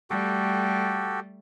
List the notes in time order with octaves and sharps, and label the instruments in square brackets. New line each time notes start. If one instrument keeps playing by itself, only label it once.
[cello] G3 A3 [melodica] F#4 G4 A4